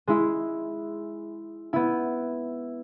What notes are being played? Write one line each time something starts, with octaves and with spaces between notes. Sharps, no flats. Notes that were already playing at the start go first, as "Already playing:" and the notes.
G#3 E4
B3 E4